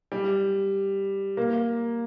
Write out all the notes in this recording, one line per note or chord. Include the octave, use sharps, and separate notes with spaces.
G3
A#3